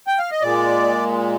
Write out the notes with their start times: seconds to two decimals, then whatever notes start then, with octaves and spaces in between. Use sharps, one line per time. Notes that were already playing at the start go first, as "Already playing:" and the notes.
0.07 G5
0.19 F5
0.31 D#5
0.42 A#2 G#3 D5